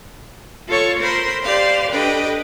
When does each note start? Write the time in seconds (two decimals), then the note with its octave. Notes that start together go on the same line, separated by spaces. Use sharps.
0.68 F4 A4 C#5 C#6
1.00 A#4 C5 B5 C6
1.43 G4 C5 D5 F5 C6
1.91 D4 G4 A4 B4 D#5 G5